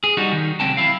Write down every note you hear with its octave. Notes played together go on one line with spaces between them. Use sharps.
G#4
G3 D#4 F#4
D#3
C2 C3 F#3 C4 G5 A5
E4 F5